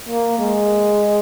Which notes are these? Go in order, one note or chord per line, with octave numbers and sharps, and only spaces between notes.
A#3
G#3